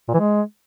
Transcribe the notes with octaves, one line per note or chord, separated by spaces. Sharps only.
A#2
E3
G#3